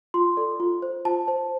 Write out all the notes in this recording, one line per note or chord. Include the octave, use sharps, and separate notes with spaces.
F4 C6
A4 D5
F4
C5
F4 A5
C5